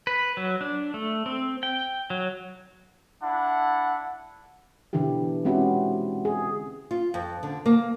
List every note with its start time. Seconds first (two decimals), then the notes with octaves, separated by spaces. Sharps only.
0.07 B4
0.37 F#3
0.61 D4
0.94 A3
1.26 C4
1.63 G5
2.10 F#3
3.22 D4 E4 F#5
4.93 B2 D3 E3 D4 E4 G4
5.45 G#3 C4 C#4 E4 F#4 G4
6.25 G#4
6.91 F4
7.14 F2
7.43 D3
7.66 A#3